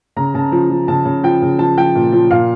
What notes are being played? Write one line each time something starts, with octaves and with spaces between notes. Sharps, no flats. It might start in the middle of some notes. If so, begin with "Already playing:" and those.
C#3 A#5
C#3 A5
F3
F3
C#3 A5
C#3
F3 G5
C#3
F3 A5
F3 G5
A#2
F3
A#2 F5